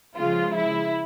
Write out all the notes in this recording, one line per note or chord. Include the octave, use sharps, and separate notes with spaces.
C#3 F3 G#3 F4
E4